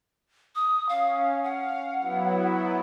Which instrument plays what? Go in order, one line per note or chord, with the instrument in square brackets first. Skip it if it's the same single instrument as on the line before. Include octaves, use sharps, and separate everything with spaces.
[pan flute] D#6
[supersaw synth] C#4 [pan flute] F5
[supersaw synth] F5 [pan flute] F#5
[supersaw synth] F#3 B3 E4